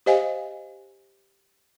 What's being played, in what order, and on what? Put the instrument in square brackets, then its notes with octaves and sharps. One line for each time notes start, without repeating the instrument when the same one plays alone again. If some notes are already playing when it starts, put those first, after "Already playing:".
[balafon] G4 C5 D#5 F5 G#5